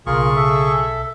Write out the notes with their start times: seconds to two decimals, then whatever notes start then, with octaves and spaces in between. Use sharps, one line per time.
0.06 B1 C#3 F4 G#4 A#4 C#6
0.36 A4 E5